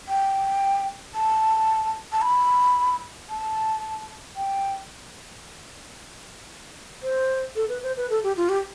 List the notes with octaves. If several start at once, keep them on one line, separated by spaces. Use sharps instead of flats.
G5
A5
A5
B5
A5
G5
C5
A4
B4
C5
B4
A4
G4
F4
G4